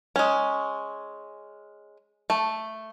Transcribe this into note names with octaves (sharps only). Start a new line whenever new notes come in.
G#3 C#4
A3